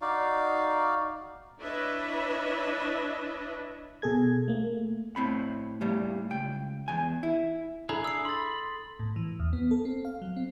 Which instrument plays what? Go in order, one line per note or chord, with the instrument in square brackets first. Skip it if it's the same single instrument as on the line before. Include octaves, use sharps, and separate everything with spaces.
[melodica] D#4 F#4 D5 F5
[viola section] D4 E4 B4 C#5 D#5 E5
[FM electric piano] B2 G#4 A4 G#6
A3 A#3
[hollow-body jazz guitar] A2 C4 B5
A2 G3 A#3
C#2 G5
E2 G#5
E4
[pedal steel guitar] D4 E4 G#4 [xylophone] A4 A#5 [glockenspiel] B5
[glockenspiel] D#6 [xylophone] E6 C7
[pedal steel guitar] B5 [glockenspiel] C6 A6
[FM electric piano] A2
E3
E2
B3
A4
C4
F5
F#3
C4